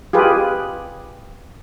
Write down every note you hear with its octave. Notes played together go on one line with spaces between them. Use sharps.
F4 G4 G#4 B4